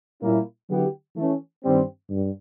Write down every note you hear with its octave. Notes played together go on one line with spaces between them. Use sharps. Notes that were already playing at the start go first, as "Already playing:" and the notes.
A#2 G3 A#3 C#4 E4
D3 F#3 B3 E4 G4
E3 A3 C#4
G2 D#3 G3 C4
G2